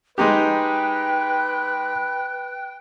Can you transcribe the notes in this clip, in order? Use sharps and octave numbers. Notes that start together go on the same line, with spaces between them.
G#3 D#4 G4 B4 G5 F#6